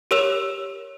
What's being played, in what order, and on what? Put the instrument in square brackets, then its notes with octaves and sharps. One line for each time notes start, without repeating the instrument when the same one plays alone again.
[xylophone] G4 A#4 C#5 E6 E7 F7